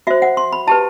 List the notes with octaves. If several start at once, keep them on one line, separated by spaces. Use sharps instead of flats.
F#4 C5 E5
F#5
C6
B5
E4 G4 B4 A5